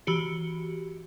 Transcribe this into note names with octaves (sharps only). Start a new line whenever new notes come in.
E3 F#4 G4 C#7